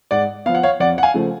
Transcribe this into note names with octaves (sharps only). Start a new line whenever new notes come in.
G#2 D5 F#5
F3 B3 F5
F#5
C#5 F5
F2 D5 F#5
F#5
F5 G#5
C#3 F3 A3